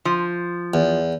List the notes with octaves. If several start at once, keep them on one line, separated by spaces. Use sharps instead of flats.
F3
E2